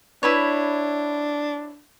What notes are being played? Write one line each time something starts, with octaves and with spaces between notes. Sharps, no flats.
D4 E4 B4 C#5